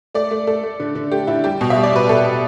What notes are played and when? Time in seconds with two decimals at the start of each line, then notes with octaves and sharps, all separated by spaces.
0.14 A3 D5
0.31 A3
0.47 A3 A4
0.63 A3
0.80 D3
0.95 D3
1.11 A3 G4
1.27 D3 E4
1.44 G3 G4
1.61 B2
1.70 E5
1.76 G3
1.83 D5
1.93 B2 B4
2.09 B2 A4
2.25 B2